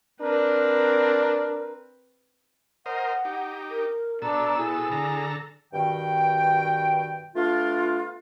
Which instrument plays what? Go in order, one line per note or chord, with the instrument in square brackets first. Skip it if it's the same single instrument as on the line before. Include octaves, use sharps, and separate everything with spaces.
[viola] C4 B4 [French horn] D4 [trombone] A#4
[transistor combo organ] A#4 C5 D#5 [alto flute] F#5
[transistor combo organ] D#4 G4
[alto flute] A#4
[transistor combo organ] B2 A4 E6 [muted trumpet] D4 [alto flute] A#5
[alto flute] E4 [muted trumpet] G#4
[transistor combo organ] D3 A4 A#5
[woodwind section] G2 B2 D#3 G5
A3 B3 D4 F4